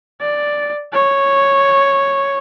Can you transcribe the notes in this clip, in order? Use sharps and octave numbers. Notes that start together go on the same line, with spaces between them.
D5
C#5